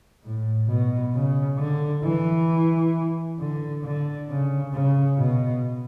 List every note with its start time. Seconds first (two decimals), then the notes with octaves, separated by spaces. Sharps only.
0.23 A2
0.68 B2
1.14 C#3
1.58 D3
2.04 E3
3.39 D3
3.84 D3
4.29 C#3
4.74 C#3
5.19 B2